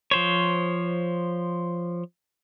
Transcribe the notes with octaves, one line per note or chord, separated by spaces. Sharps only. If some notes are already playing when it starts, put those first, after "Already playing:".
F3 C5 C#5